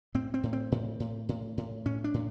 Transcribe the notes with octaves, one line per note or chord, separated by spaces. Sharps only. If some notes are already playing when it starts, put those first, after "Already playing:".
A2 C4
C4
A2
C4
A2
A2
A2
A2
A2 C#4
D4
A2